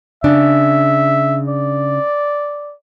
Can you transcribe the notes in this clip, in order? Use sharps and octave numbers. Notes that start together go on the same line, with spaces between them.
C#3 D4 E5
D5